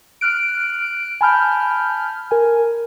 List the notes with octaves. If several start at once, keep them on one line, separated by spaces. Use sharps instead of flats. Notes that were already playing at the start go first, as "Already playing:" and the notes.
F6 F#6 D7
G#5 A5 B5 F6 G6
A#4 G#5